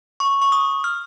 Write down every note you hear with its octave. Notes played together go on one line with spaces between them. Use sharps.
C#6
C#6
D#6
F6